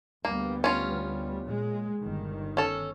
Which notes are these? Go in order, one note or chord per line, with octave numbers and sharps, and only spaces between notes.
D2 G3 A#3 B3
C#4 F4
A#2 G#3
G1 D#3
C#4 A4